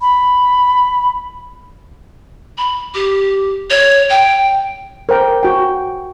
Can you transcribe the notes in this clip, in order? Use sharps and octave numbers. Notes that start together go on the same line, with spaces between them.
B5
B5
G4
C#5
G5
A#4 C5 G5
F#4 G5